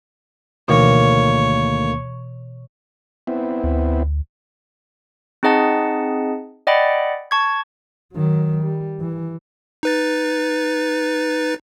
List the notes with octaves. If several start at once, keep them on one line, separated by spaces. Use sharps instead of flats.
D2 B2 D#3 E3 A#3 C#5
B3 C4 E4
D2
C4 D#4 G#4 D#5 F#5 A5
D5 D#5 F#5 G5 B5
A5 C#6 G#6
D#3 F#3
G3
E3
D#4 B4 A6